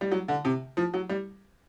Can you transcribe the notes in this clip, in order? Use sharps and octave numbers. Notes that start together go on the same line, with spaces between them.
G3
F#3
D3
C3
F3
F#3
G3